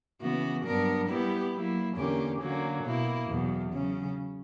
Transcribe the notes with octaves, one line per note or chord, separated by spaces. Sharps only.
C#3 E3 B3 F#4
G2 F#3 B3 D4 A#4
G3 B3 E4 G4 B4
F#3 A#3 E4
E2 D3 A#3 C#4 G4
D3 F#3 A#3 C#4
B2 A#3 E4
E2 B2 F#3
C#3 F#3 C#4